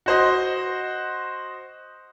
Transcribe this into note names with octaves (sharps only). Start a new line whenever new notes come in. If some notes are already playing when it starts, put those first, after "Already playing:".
F#4 C5 D#5